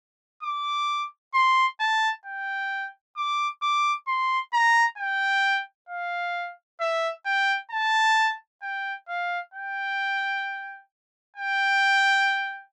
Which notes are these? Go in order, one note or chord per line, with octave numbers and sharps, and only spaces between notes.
D6
C6
A5
G5
D6
D6
C6
A#5
G5
F5
E5
G5
A5
G5
F5
G5
G5